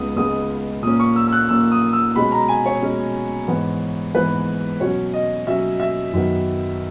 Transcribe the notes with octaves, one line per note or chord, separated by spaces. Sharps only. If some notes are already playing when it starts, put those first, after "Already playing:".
Already playing: C#2 C#3 G#3 B3 D#6
C#2 C#3 G#3 B3 D#6
A#2 A#3 C#4 D#6
C#6
E6
E6
F#6
A#2 A#3 C#4 E6
D#6
E6
B2 G#3 C#4 B5
A#5
G#5
C#5
B2 G#3 C#4
G#2 E3 B3
G#2 E3 B3 B4
B2 F#3 C#4 C#5
D#5
B2 F#3 C#4 E5
E5
F#2 D#3 F#3 B3